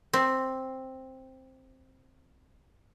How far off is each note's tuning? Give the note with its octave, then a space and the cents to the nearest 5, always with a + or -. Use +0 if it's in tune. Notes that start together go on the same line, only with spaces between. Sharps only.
C4 +5